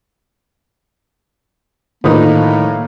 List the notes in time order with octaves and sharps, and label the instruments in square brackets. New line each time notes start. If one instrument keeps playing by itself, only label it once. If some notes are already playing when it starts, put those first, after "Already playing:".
[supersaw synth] A2 [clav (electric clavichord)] D3 D#3 F3 [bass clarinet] A#3 [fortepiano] D#4 B4